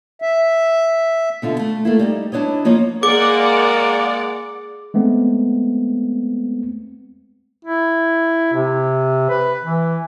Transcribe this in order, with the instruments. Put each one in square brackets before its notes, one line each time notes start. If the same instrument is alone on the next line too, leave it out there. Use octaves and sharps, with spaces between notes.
[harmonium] E5
[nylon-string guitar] B2 D3 F4
A3
A3 A#3 E4
G3 B3 D#4
D4 E4 B4 C#5 D#5
F3 A#3 C#5 D#5
[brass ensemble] G#3 A#3 [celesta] G#4 [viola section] D5 F#5 [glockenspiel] D6
[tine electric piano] G#3 A3 B3 C4
[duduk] E4
C3
B4
E3